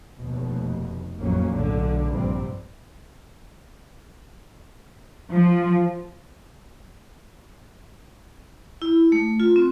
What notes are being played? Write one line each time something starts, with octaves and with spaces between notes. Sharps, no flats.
F1 D#2 B2
A1 F2 F#3 A#3 C#4
B1 A2 D3
A#1 G2 C3 G3 C4
F3
E4
A3
F4
C4